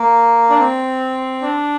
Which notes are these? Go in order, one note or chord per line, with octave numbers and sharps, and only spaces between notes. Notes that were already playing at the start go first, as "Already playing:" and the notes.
Already playing: A#3
D4
C4
D4